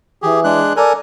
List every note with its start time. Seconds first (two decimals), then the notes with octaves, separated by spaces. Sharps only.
0.22 E3 G4 G#4
0.44 G#3 D4 F#6
0.77 A4 A#4 D5 G#5